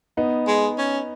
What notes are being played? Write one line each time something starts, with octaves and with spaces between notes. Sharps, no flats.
B3 D#4
G#3
C#4